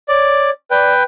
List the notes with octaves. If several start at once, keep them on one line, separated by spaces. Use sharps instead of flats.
C#5 D5
B4 D5 G5